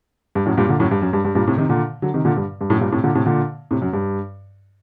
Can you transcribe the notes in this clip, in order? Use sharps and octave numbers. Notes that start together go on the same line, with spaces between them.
G2
F#2 A2
G2 A#2
A#2 D3
F#2 A2
G2
F#2
G2
G2
G2 A#2
A2 C3
C3 D#3
A#2 D3
D3 F#3
C3 D#3
A#2 D3
G2
G2
F#2 A2
G2 A#2
A2 C3
A#2 D3
A2 C3
A#2 D3
A2 C3
F#2
G2